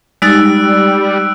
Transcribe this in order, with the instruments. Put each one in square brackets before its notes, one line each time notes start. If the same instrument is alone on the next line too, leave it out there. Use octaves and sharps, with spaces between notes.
[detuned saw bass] G3 [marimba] G#3 D#4 A6 [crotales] E6 F#6 D7